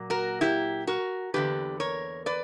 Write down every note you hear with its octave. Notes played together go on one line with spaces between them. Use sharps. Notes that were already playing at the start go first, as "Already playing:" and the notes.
Already playing: A#2 F#3 A#3
F#4 A#4
E4 G4
F#4 A#4
E2 D3 F#3 A#3 G4 B4
A#4 C#5
B4 D5